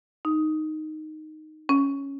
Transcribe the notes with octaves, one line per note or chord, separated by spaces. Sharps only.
D#4
C#4